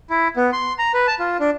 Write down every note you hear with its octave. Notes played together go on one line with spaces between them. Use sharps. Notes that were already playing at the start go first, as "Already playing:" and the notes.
E4
B3
C6
A#5
B4
A5
F4
D4